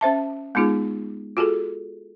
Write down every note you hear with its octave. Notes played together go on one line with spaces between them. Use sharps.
C#4 C5 E5 A5
G#3 B3 D#4 F4 G#4
F4 F#4 G#4 A4